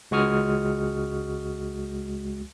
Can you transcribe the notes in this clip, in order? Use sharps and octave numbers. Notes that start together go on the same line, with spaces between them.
C#2 G#3 F#4 C#6 D#6 F6